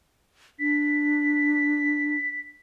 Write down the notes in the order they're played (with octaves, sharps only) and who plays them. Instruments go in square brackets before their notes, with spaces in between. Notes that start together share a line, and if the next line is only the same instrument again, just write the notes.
[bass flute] D4 [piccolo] B6